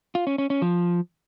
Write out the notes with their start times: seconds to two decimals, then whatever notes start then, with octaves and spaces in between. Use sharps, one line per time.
0.15 F4
0.27 C#4
0.38 C#4
0.50 C#4
0.62 F3